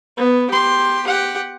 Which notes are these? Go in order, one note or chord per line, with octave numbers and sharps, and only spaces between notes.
B3
G4 C6
G4 F#5